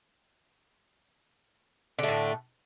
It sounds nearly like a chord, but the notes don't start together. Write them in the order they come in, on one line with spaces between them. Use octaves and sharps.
D3 A3 A2